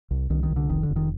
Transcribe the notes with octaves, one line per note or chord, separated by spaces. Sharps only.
C2
C2 D#3
D#3
C2
D3
F1 D#3
D3
F1
D#3